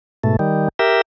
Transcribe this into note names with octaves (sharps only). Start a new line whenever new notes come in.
G#2 B2 A3
D#3 G3
G4 A#4 E5